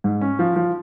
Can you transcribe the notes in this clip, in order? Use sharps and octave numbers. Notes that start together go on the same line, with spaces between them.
G#2
C#4
F3
F3